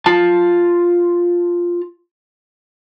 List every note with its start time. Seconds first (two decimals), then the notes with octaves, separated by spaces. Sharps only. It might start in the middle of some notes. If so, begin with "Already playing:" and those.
0.06 F4 A5